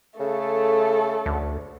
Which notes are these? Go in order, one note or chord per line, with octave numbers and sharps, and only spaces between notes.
C#3 A3 A4
D2